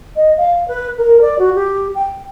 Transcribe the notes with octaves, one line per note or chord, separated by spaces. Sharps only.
D#5
F5
B4
A#4
D5
F#4
G4
G5